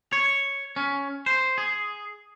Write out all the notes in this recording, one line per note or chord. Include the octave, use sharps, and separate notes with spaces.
C#5
C#4
C5
G#4